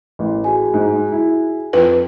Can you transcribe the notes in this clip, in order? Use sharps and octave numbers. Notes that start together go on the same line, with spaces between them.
A1
F#4 G#4 G#5
G#2
E4
F2 B4